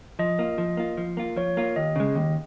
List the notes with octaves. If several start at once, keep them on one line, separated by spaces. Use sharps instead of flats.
F3 D#5
A#3 F4
F3
A#3 F4
F3
A#3 F4
F3 C#5
A#3 F4
D#2 D#5
C#3 G#3
D#2